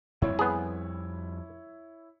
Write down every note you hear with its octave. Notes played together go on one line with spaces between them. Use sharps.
F2 G3 C4 E4 C#5
B3 G#4